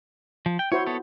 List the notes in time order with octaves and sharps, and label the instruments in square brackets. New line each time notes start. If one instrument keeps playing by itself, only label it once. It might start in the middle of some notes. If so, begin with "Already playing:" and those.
[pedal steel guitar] F3
G5
[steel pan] E4 F#4 C5 [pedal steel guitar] C#5
[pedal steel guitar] B3 A4 C#5